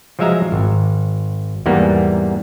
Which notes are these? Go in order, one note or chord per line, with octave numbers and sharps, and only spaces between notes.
F3 F#3 G#3 E5 F5 A#5
G#1
E2 G#2 G3 A#3 B3